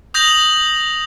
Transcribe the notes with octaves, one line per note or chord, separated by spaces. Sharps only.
D#6 G6 A#6 F7 F#7